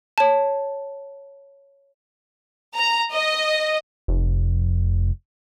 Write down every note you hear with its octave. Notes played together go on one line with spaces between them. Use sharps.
C#5 A5
A#5
D#5
F1